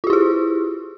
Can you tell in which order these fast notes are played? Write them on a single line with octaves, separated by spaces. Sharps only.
F4 G4 E4 G#4